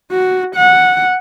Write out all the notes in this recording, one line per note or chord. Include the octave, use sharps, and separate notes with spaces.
F#4
F#5